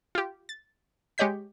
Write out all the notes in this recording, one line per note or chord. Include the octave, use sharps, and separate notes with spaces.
F4 G4
A6
G#3 G4 C#5 D#5 G6 B6